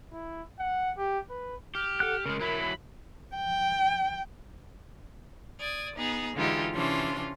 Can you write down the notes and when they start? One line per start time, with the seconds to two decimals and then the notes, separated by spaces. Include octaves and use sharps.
0.12 E4
0.58 F#5
0.98 G4
1.29 B4
1.75 G4 F6
2.00 A4 F#5 F#6
2.26 C#3 G#3 A#4
2.41 F#3 E4 B5
3.36 G5
5.60 D5 D#6 G#6
5.96 B3 D#4 G#4
6.35 D3 E3 G#3 D#4 F4 G4
6.74 C3 E3 C#4 D4 F4 C6